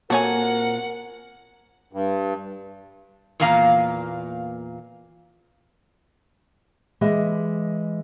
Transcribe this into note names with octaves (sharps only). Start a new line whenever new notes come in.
A#2 C4 F#4 A4 A#4 C#5 F#5 G#5
G2
E2 A#2 A#3 F5 A#5
E3 G#3 G4 D#5 E5